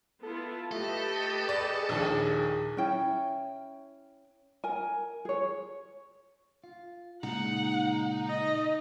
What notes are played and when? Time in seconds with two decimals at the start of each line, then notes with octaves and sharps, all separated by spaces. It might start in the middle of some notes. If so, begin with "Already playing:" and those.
0.23 B3 E4 F4 A4
0.72 A3 G4 A4 B4 D#5
1.49 G#4 D5
1.89 A#1 D#2 G#4
2.77 C#4 E4 G5
4.64 A#4 G#5
5.25 G#4 C#5
6.64 F4
7.23 A#2 C#3 G#3 D#4 F#5
8.27 D#5